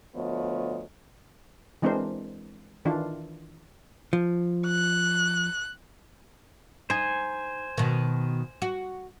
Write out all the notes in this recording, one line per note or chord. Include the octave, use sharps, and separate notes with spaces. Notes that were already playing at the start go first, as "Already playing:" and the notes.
D2 F3 B3 C#5 D#5
E3 G#3 C4 D4 A#4 C5
D#3 E3 D4 F4
F3
F#6
D#4 C5 G#5
B2 D#3
F#4